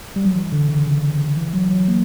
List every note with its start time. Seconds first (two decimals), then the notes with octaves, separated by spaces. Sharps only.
0.16 G3
0.25 F#3
0.35 E3
0.52 D3
0.69 C#3
0.86 C#3
1.37 E3
1.54 F#3
1.71 F#3
1.88 A#3